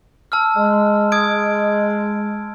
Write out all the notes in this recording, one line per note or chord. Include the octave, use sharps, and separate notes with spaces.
A5 E6 F6
G#3
D#6 G#6 D7